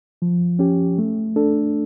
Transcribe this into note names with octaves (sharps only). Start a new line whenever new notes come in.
F3
C#4 G4
A3
D4 A4